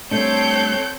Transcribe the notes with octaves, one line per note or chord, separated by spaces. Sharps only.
G3 A3 C4 D4 A4 C#5 G6